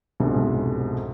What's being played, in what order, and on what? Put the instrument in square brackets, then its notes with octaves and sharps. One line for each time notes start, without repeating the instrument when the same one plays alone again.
[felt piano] C2 F2 G#2 B2 D3 G#3